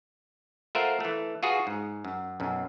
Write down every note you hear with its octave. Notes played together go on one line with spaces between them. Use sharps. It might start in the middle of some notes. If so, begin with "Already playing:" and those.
A3 F4 A#4 C5 E5 F#5
E3 A3
F4 F#4 G#4 B4
G#2
F#2
B1 F#2